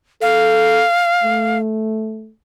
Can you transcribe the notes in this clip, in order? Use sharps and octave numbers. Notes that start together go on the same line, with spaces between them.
A4 F5
A3